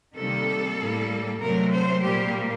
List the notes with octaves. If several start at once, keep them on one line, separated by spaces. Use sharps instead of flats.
C3 D#3 G3 A#3 A4
A2 G3 A#3
C3 F#3 A3 C4 A#4
C5
A#2 G3 A#3 G4